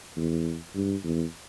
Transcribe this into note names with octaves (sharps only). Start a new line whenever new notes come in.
E2
G2
E2